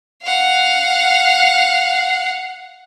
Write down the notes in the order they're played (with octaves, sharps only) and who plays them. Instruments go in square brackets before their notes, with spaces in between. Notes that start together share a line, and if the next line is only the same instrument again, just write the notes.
[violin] F5 F#5